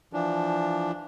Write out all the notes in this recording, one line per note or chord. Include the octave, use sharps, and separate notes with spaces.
E3 F3 D4